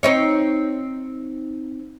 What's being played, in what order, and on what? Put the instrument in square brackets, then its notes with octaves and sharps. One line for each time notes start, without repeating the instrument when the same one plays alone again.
[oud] C4 D#4 C#5